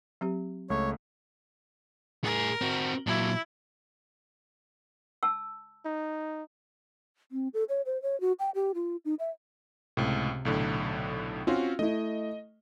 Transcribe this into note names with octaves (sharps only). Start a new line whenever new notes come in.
F#3 C4 G4
C#2 A3 C#5
A2 G#4 A#4
C4 F#4
A#2 F#3 E4
A5 E6
D#4
C4
A4
C#5
C5
C#5
F#4
G5
G4
F4
D#4
E5
C#2 A2 C3
B1 A2 D3
C4 C#4 F4 F#4
A3 E4 D#5